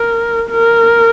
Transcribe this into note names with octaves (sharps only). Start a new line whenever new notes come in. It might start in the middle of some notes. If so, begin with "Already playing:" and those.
Already playing: A#4
A#4